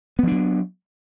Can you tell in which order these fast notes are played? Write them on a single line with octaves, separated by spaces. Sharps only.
B3 F3 D4 F#3